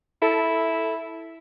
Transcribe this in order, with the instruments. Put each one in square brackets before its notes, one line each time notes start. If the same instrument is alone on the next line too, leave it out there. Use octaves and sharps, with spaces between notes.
[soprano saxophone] E4 [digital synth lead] A4